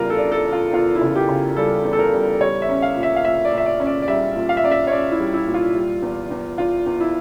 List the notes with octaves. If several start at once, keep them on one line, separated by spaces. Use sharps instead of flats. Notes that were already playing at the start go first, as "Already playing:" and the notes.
Already playing: E2 C#3 G3 F4 A#4
A4
D4
A4
D4
F4
E2 F4
E4
C#3 F4
G4
C#3
G3 A4
E2
A4
A#4
G3
G3 C#5
E5
C#4
F5
A#2
E5
F5
A#2 E5
D5
A#2
E5
D5
C#4
D5
D5
G3 E5
A#2
F5
E5
C#4 D5
E5
C#5
C#4 D5
E4
G3
E4
A#2
F4
G3
E2
E2
E2 F4
E2
E4